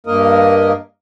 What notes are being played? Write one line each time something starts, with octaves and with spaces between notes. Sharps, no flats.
G2 A#3 A#4 D#5